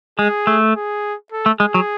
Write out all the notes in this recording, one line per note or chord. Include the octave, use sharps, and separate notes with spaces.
G#3 G#4
A3
G#4
A4
A3
G#3 G#4
F#3